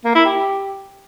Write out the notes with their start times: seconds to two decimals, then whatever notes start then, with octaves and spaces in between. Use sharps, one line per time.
0.05 A#3
0.15 E4
0.25 G4